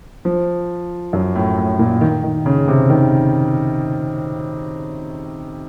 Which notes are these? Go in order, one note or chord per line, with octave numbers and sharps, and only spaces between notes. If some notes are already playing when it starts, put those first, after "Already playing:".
F3
F#2
A2
A2
A#2
D#3
D#3
C#3
C3
D#3